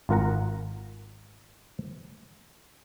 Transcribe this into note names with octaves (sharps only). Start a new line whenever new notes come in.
G#1 F4 A#4 F#5 A#5